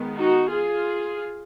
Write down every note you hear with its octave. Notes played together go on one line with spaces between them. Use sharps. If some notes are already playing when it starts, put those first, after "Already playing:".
Already playing: D#3 G#3 B3
D#4 F#4
F4 G#4